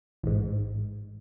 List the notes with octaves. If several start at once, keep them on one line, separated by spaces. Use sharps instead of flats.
A1 G#2